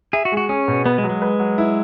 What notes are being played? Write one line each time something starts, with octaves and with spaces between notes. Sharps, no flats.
G#4 E5
F#4
G#3
F#4
C#4 G#4
B2
B3 B4
G#3
F#3
G#3
B4
F#3
E4